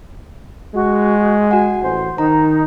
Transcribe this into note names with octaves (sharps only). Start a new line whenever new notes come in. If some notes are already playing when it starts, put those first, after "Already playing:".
G#3 F#4
F#4 F#5 G#5
A1 C5
D#3 D#4 A#5